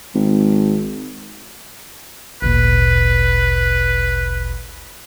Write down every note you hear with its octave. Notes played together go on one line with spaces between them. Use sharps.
G#1
G#1 D2 A#2 B4